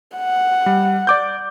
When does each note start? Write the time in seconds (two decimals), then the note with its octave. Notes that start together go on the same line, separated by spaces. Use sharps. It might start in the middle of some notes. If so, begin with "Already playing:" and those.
0.17 F#5
0.66 G3
1.07 D5 D6 G6